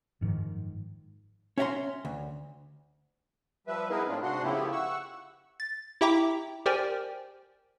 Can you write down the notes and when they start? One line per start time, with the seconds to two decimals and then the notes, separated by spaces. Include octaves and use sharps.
0.21 F#1 G#2 D#3 F3
1.58 C#4 C#5 E5 F#5 A#5 C6
2.05 D2
3.67 F3 G3 B4 E5
3.90 B3 D#4 E4 G#4 A#4 B4
4.08 A2 G#3 C4 D4 F4
4.22 G#2 C3 D4 F#4 F#5 C6
4.43 C#3 F3 A3 B3 E4 G4
4.72 F#5 C#6 E6
5.60 A6
6.01 E4 G4 E5 G5 A#5 D6
6.66 G4 A#4 C5 D5 G5 G#5